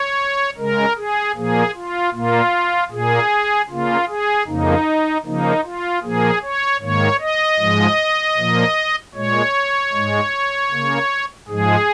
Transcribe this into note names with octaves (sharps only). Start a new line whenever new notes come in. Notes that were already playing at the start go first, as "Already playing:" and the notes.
Already playing: C#5
C#3 G#3 A#4
G#4
A#2 F3 A#3 G#4
F4
A#2 A#3 F4
A#2 A#3 G#4
C#3 A#3 F4
G#4
F2 C#3 F3 A#3 D#4
C#3 F3 A#3 D#4
F4
A#2 F3 A#3 G#4
C#5
G#2 D#3 A#3 C#5
D#5
G#2 F3 G#3
A#2 F3 A#3
A#2 G#3 C#5
G#2 G#3
C#3 A#3
G#2 F3 G#3 G#4